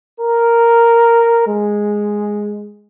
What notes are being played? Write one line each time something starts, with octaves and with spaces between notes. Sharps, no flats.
A#4
G#3